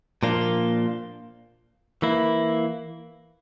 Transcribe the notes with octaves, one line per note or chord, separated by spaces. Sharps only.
A#2 F3 A#3 D4 F4
E3 A#3 E4